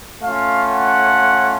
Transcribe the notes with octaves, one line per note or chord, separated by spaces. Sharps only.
A3 C#4 F4 F5
F#5